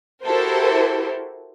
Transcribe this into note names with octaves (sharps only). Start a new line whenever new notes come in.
E4 F#4 G4 A4 A#4 C5